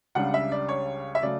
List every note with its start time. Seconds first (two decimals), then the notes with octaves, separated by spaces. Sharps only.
0.15 C#2 C#3 G3 D4 F#5
0.34 E5
0.52 D5
0.69 C#5
1.15 E5
1.23 C#3 F#3 A3 D5